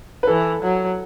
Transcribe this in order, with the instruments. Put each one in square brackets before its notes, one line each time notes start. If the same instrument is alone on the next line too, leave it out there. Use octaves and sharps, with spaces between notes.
[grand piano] B4
[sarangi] E3 [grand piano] A4
[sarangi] F#3